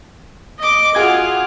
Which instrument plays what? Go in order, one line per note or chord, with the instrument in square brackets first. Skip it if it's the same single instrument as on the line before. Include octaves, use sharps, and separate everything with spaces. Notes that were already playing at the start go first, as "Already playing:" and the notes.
[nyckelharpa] D#5 D6
[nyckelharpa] F4 [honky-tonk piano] F#4 G#4 G#6